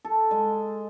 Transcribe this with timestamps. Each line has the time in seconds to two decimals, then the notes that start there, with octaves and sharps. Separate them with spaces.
0.05 A4
0.31 G#3